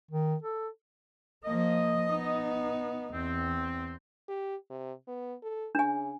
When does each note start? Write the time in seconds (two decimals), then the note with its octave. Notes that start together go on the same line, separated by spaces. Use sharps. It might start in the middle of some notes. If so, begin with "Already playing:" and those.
0.11 D#3
0.43 A4
1.45 F3 A#3 D#5
2.10 B3 D#4
3.14 E2 C4
4.29 G4
4.70 C3
5.08 B3
5.43 A4
5.75 C#3 D4 G#5